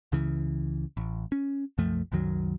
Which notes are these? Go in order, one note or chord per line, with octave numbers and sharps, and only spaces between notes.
C#2 C#3 E3
A1
C#4
C2 F#2 F3 A3
C2 F#2 D#3 F#3